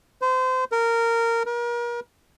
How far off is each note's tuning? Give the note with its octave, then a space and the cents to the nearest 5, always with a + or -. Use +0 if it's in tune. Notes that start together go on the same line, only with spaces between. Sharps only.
C5 -30
A#4 -15
A#4 +35